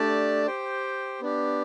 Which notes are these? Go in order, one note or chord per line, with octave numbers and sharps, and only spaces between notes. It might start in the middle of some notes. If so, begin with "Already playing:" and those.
Already playing: A3 D4 G4 D5 A5
G4 C5 G5
B3 D4 G4